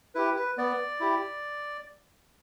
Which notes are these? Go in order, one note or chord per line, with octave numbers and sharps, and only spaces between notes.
E4 G4 B4
B4
B3 D5
E4 G4